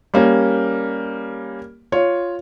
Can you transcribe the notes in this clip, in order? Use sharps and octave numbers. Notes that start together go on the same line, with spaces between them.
G3 A#3 C#4
F4 C#5